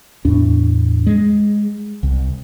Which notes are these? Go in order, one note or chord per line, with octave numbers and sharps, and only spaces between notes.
E2 A2 D4
G#3
C2